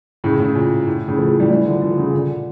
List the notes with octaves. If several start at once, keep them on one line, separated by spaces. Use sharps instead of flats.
A2 C#3
A2 C#3
A#2
A2
A2 C#3
F3 A3
F3 A3
E3 G3
E3 G3
D3 F3
D3 F3
C#3 E3
A#2 D3
A#2